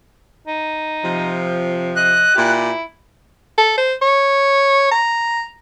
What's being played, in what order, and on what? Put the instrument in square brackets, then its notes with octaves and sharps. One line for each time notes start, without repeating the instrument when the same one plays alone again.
[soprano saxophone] D#4
[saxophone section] C3 F3
[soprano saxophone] D#5 [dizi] F#6
[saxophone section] A#2 G4 [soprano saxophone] E4
[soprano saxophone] A4
C5
C#5
A#5